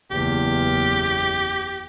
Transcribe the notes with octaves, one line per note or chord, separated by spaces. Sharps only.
F#1 E2 G4